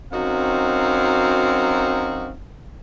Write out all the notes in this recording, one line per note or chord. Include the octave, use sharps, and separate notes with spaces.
F#2 C4 D#4 F#4 F5